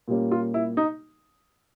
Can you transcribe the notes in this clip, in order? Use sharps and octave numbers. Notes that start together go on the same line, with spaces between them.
A#2 G3 A#3 C#4
F4
E4
D#4